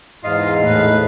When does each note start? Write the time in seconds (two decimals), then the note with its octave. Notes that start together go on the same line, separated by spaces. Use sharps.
0.24 E2 G#2 F4 D#5 F5
0.63 A2 B4